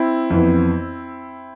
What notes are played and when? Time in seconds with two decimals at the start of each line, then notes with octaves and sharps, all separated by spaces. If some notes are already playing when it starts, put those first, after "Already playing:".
Already playing: C4 E4
0.30 F2 E3 B3